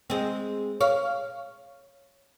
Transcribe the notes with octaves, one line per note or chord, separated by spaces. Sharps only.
G#3 C4
C#5 F5